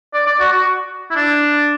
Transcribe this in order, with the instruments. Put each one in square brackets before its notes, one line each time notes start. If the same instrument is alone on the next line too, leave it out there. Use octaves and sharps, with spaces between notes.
[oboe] D5
D5
F#4
F#4
E4
D4